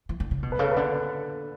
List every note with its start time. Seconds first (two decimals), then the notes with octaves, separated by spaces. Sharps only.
0.09 E3
0.20 D3
0.31 C#3
0.43 B2
0.52 B4
0.59 C#3 A4
0.71 B4
0.76 D3